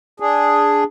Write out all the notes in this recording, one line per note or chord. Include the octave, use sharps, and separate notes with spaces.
D4 G#4